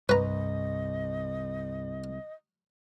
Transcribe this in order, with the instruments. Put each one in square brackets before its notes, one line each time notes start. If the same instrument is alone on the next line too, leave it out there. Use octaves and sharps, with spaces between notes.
[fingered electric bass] C2 [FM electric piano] G2 [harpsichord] B4 A#5 [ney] D#5